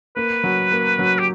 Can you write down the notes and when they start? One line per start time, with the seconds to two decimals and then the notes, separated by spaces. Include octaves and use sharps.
0.16 A#3 B4
0.44 F#3
0.71 A#3
0.99 F#3
1.19 G4